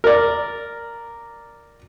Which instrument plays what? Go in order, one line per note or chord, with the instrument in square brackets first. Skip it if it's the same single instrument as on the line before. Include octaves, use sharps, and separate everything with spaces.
[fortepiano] A#4 D5